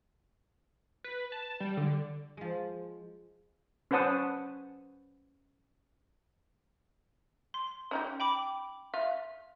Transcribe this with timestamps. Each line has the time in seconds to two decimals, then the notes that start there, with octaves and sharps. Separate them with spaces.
1.04 B4
1.32 A5
1.60 G3
1.77 D3
2.37 F3 G#3
3.91 C#4 B4 C5 F#5 A5 D#6
7.54 C6
7.91 C#4 D#4 G4
8.20 G5 B5 D6
8.94 F4 E5